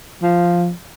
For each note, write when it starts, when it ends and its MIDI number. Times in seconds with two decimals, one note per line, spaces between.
0.23 0.71 53